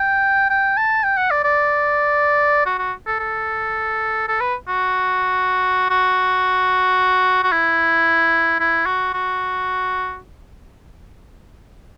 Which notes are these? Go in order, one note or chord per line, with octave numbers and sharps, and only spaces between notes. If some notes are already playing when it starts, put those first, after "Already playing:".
Already playing: G5
G5
A5
G5
F#5
D5
D5
F#4
F#4
A4
A4
A4
B4
F#4
F#4
F#4
E4
E4
F#4
F#4